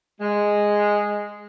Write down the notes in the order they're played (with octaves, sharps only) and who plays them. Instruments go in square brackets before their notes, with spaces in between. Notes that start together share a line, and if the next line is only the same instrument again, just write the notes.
[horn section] G#3